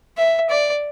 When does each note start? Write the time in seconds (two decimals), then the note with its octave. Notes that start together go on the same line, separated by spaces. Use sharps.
0.17 E5
0.50 D5